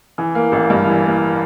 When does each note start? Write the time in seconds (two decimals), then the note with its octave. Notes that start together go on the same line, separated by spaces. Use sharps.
0.18 E3
0.35 A#3
0.52 A1
0.70 G2
0.87 E3
1.05 A#3